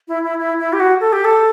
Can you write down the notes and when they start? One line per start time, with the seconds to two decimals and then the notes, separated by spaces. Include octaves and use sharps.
0.08 E4
0.24 E4
0.39 E4
0.59 E4
0.73 G4
0.80 F#4
1.01 A4
1.13 G4
1.25 A4